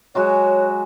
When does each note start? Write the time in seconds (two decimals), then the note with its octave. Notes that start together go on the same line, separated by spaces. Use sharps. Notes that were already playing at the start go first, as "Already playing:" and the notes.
0.15 F#3 G#3 F#4 C#5